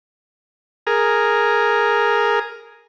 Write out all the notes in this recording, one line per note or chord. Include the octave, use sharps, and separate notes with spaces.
G#4 A#4